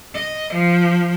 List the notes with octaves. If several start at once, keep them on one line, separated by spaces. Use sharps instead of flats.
D#5
F3